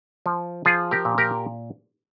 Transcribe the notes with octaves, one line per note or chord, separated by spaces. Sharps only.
F3
F3 F4 G#4
G4 A#4
A#2
G4 A#4